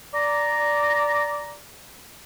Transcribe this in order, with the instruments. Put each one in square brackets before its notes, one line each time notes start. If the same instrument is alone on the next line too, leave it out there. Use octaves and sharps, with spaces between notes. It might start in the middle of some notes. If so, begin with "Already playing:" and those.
[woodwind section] D5 A#5